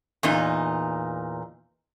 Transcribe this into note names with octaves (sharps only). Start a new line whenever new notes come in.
E2 A#2 D#4